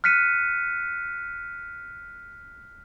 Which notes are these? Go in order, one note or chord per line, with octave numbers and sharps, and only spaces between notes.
F6 F#6 B6 C#7 D#7